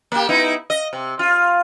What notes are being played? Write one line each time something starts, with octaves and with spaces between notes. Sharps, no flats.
A#3 G4
B3 D#4 E4
D#5
C3
F4